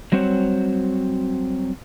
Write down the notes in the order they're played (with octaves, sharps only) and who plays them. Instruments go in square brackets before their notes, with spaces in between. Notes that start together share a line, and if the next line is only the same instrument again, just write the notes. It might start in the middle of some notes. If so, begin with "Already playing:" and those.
[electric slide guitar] F#3 G3 C4 F#4 C5 C#5